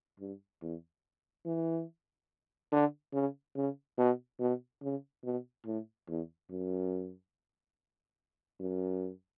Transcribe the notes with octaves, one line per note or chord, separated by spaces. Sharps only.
G2
E2
E3
D3
C#3
C#3
B2
B2
C#3
B2
A2
E2
F#2
F#2